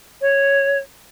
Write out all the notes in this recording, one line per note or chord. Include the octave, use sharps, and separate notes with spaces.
C#5